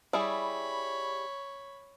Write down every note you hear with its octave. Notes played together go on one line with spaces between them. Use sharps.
G3 E4 G#4 C#5 B5